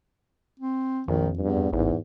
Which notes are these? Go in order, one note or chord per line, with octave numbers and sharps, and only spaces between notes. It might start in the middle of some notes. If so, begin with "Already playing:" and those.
C4
A#1 F2 D#3
E2 G2
A1 E2 G#2